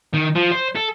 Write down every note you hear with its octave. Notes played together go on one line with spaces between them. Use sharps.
D#3
F3
C5
A4